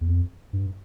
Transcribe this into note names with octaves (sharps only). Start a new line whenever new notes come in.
E2
F2
G2